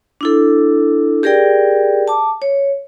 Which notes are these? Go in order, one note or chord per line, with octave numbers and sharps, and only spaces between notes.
D4 E4 A4
G4 G#4 A#4 D5 G5
A5 D6
C#5